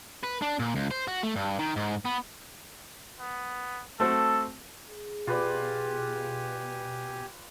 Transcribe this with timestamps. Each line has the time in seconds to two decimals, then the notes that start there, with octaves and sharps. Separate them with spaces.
0.23 B4
0.42 D4
0.59 A#2
0.75 C#2
0.91 C5
1.08 F#4
1.23 A3
1.36 G2
1.59 D#3
1.76 G#2
2.05 B3
3.20 B3
4.00 A3 C4 F#4 A4
4.90 G#4
5.27 B2 F4 G4 B4 D5 G#5